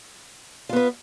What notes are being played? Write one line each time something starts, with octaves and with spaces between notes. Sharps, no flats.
B3 F4 B4